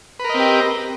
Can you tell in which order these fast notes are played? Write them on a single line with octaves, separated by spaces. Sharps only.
B4 A#4 D#5 C4 G4